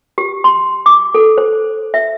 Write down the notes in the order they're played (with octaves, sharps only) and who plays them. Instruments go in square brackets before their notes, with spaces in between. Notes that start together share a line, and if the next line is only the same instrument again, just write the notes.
[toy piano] G4
C6
D6
A4
C5
E5